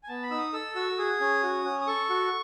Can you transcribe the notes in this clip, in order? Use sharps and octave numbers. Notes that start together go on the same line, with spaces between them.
G#5
B3 A5
B5
D#4 E6
D#6
A4 E6
F#4 E6
G#4 D#6
C#4
F#4
C#4
D#6
A4 C#6
F#4